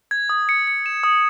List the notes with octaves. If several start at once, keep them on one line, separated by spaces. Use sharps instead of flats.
G#6
D#6
C#7
C#7
E7
D#6